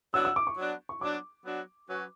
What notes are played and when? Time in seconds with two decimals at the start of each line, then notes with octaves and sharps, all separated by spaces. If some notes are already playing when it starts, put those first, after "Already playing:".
0.14 F#3 B3 D4 F#4 E6
0.25 E6
0.36 D6
0.47 C#6
0.57 F#3 B3 D4 F#4
0.89 C#6
1.01 F#3 B3 D4 F#4 D6
1.45 F#3 B3 D4 F#4
1.88 F#3 C#4 F#4 B4